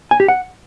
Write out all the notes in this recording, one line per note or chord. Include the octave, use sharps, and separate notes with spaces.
G#5
G4
F#5